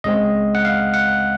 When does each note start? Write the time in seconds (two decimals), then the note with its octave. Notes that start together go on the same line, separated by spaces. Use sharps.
0.04 C#2 C#3 G#3 C4 D#5
0.55 F#5
0.65 F5
0.94 F#5